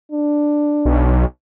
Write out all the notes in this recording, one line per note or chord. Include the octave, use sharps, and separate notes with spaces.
D4
B1